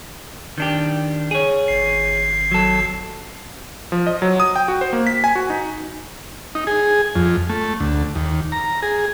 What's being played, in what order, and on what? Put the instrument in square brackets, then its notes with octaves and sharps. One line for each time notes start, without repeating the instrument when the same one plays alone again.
[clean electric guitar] D#3 D4 G4
G#4 C#5
[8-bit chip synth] G#1 C7
[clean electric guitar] F#3 A4
[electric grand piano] F3
D#5
F#3
D#6
G5
F#4
C5
A#3
B6
G#5
F#4
D#4
[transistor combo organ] D#4
G#4
F2
A3
D2
D#2
A#5
G#4